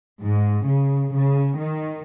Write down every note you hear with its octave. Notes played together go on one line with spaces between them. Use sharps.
G#2
C#3
C#3
D#3